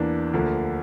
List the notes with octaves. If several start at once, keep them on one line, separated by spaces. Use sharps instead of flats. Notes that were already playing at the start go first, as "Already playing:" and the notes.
Already playing: E2 E3 A#3 D4
D2 D3 F3 A#3